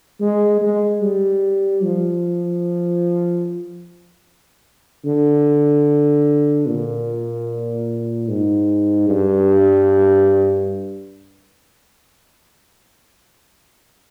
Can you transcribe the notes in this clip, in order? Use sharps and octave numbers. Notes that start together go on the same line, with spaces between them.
G#3
G#3
G3
F3
D3
A#2
G#2
G2